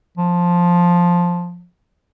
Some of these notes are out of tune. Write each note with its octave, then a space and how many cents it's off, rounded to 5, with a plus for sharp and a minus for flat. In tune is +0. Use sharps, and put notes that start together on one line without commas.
F3 +5